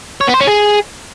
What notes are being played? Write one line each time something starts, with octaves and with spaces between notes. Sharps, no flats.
C#5
B3
C5
C#4
G#4